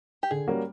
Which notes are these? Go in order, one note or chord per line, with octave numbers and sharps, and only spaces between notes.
G4
D3 G#4
G3 A#3 C#4 F#4